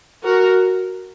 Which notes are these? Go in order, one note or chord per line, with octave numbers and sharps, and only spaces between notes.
F#4 A#4